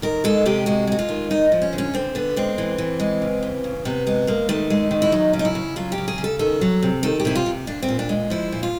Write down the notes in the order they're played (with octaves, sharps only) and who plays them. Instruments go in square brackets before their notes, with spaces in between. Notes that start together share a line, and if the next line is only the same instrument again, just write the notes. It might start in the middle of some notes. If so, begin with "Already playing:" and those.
[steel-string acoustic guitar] D#3 A#4
G#3 A4
C3 G4
G#3 F#4
G#3 F#4
F4
D#3
G#3 D#4
F3
C#4
D3
C#4
D3 C4
D3 B3
G#3 C4
E3
E3
G#3
C#3
E3
C#3
C3 B3
G#3 B3
G#3 A#3
D#3 A3
G#3
D#3
E4
F#3 D#4
C#3
D#4
E4
C#3
F#3 F4
G4
C#3
G#4
C#3
A4
D#3 A4
F#3
C3
D#3 A4
G4
C3 E4
F4
C3
A#2 D4
C4
A#2
D4
G#3
F3 E4
A#2
F4